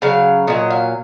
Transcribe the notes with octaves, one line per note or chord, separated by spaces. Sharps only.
C#3 F#3 F5
A#2 F#3 D#5
F5